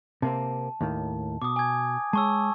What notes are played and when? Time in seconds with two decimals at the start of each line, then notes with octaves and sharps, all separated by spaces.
0.22 C3 A#3 C4 A5
0.81 D#2 A2 D#3
1.42 B2 D6 D#6
1.56 G#5 G#6
2.13 G#3 C#5 A5 C#6 E6